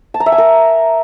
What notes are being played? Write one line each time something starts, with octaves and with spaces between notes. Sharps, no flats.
A5
A#5
E5
G#5
A#4